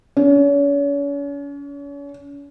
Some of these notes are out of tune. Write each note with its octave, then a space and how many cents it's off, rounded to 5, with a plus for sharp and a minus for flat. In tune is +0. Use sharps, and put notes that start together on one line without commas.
C#4 +40